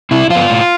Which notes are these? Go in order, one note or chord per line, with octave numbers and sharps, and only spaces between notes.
C3 E4
F3 B3 F4
A2